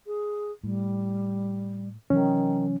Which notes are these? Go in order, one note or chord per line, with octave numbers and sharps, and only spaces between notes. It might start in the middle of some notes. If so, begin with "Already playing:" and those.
G#4
A2 G3
C3 D#3 E3 F#3 C#4